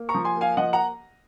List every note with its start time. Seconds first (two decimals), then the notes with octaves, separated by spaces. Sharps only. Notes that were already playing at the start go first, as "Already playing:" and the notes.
Already playing: A#3
0.09 A#5 C#6
0.15 F3
0.25 G#5 C6
0.35 A#3
0.41 F5 G#5
0.57 F3 D#5 F#5
0.73 F#5 A#5